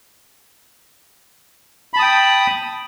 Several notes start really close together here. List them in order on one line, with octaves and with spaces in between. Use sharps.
B5 A5 D#6 G5